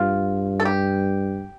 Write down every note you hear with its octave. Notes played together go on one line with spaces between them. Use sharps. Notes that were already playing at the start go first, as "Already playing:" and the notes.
Already playing: G2 F4
A4
G4